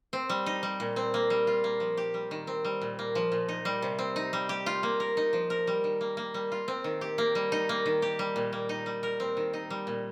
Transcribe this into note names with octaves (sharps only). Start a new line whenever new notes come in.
C4
G3
D#4
G3
A#2
C4
A#3
G3
F4
A#3
F3
G4
G3
D#3
C4
G3
A#2
A#3
F3
A#2
D#4
G3
C3
C4
D#4
G3
G4
F4
A#3
A#4
D#4
F3
A#4
G3
D#3
A#3
A#3
G3
F4
C4
D#3
G4
A#3
G3
D#4
A#3
D#3
G4
G3
A#2
A#3
D#4
G3
A#4
C4
D#3
D#4
G3
A#2